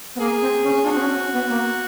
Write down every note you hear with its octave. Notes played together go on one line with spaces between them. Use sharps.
B3
A#3 G#4
C4
C#4
D4 F#4
C4
C#4
B3
A#3